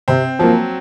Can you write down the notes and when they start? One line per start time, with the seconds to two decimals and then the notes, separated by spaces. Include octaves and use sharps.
0.08 C3 C4
0.39 F3 F#3 A#3